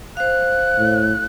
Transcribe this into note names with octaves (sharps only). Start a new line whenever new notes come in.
C5 F5 F#6
A2